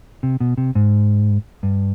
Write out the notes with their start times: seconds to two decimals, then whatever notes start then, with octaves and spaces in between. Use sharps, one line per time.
0.23 C3
0.40 B2
0.58 C3
0.75 G#2
1.63 G2